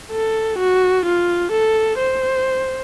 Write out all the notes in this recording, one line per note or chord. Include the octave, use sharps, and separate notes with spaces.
A4
F#4
F4
A4
C5